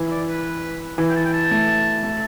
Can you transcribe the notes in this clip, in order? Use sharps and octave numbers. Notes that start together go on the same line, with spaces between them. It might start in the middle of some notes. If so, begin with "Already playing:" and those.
Already playing: E3
D5
B4
E3
G5
A5
G5
A5
A3
A3